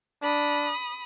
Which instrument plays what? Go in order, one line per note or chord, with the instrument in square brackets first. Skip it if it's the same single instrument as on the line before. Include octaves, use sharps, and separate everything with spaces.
[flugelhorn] D4 [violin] B5 D#6